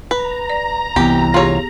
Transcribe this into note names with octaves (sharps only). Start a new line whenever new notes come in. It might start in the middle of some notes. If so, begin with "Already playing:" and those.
B4 A#5
D5
C2 E3 B3 G4
F4 G4 G#4 C#5